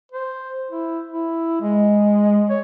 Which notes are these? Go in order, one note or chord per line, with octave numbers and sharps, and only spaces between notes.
C5
E4
E4
G#3
C#5